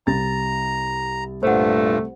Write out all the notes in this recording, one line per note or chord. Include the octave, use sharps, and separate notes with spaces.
C2 A#5 A6
G2 A#2 A3 C5 F#5